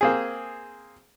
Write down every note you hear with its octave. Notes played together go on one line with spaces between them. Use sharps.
A#3 C4 G#4